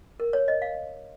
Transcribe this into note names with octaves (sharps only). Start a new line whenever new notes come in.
A#4
C#5
D#5
F5